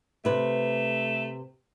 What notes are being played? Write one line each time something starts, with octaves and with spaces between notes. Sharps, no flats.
C3 A3 B4